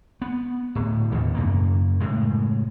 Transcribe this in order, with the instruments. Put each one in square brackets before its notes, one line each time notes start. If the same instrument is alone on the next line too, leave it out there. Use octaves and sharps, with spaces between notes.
[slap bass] B3
D1 A2
D#2 B2 D3
F#2 C#3 A#3
A2 C#3 G#3